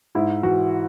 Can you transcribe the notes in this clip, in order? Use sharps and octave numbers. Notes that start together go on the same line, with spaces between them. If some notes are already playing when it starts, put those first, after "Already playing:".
G#2 E4
E3 F#4